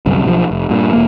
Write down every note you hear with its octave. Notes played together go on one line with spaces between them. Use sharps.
G1 C2 F#2
B1 E3 F3
F1
G2 A#2
E1 A#3